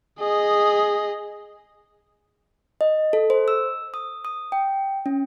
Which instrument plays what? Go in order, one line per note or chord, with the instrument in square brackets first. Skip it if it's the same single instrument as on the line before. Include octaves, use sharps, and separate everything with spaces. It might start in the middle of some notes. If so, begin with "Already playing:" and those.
[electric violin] G#4 D#5
[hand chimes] D#5
A4
C5
E6
D#6
D#6
G5
C#4